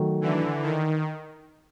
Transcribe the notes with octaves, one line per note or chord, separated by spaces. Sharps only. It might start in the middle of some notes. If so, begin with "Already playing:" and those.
Already playing: D#3 F#3 A3
D3 E3
D#3